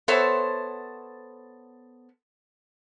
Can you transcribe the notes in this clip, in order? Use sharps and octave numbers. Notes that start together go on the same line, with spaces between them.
B3 A4 C5 C#5 E5